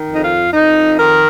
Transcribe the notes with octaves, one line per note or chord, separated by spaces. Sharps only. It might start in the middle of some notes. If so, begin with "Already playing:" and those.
Already playing: D#3
F2
D#4
F4
F2 D#4
D#3 A#4